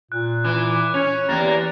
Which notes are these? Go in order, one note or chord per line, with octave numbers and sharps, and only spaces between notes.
A#2 F#6
E3 D6
C#4 C#5 F7
E2 A#3 G4 A#5 A6